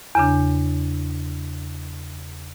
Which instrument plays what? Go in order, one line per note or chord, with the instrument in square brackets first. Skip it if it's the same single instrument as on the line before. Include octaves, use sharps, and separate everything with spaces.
[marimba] E2 C#3 D4